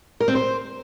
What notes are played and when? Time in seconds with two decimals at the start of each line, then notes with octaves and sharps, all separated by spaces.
0.20 A#4
0.28 C4
0.35 C5